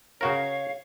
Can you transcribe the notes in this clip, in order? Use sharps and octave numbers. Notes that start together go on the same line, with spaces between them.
C#3 F#4 A#4 C#5 F5